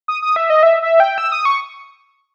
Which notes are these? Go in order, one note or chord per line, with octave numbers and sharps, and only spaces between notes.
D#6
D#6
E5
D#5
E5
E5
G5
E6
D#6
C#6